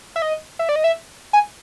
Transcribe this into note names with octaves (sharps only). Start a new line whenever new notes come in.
E5
D#5
E5
D5
D#5
E5
G#5